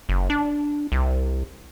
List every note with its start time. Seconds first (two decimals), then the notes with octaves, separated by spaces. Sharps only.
0.09 F#1
0.30 D4
0.92 C2